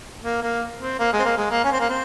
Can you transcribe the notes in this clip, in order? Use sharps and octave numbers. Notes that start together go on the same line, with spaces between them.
A#3
A#3
C4
A#3
G#3
C4
A#3
G#3
A#3
C#4
C4
A#3
C4